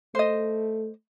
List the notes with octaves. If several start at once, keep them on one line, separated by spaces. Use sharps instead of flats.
A3 C5 D#5